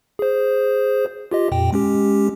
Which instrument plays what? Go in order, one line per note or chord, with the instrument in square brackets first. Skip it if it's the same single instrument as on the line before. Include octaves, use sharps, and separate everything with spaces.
[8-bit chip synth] G#4 C5
F4 G4 D#5
F2 A#2 G5
G#3 C#4 G4